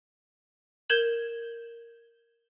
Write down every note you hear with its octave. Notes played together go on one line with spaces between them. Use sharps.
A#4 G6 G#6 E7 F#7